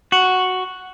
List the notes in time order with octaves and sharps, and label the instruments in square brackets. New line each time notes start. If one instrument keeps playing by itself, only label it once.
[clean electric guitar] F#4